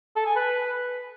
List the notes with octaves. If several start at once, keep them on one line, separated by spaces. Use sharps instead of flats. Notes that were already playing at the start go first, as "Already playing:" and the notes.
A4
G#5
B4